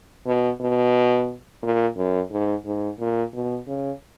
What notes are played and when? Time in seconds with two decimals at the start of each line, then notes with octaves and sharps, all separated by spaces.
0.26 B2
0.61 B2
1.63 A#2
1.97 F#2
2.31 G#2
2.65 G#2
3.00 A#2
3.33 B2
3.67 C#3